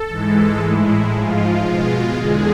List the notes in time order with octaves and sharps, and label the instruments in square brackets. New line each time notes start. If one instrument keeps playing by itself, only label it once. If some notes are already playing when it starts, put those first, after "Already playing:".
Already playing: [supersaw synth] A4
G#2 E3 G#3
A2 G#3 E4
G#2 F3 G#3 F4
B2 G#3
E2 D3 G#3 G#4